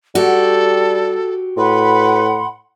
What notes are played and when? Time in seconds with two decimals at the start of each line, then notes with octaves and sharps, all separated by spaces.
0.15 G3 F#4 G4 A4
1.57 A2 B4 F#5 B5 C6